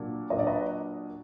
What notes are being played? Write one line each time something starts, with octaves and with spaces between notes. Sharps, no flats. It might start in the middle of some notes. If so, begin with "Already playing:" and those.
Already playing: A#2 F#3 A#3 D4
A#2 F#3 A#3 D4 D#5
D5
B4 D#5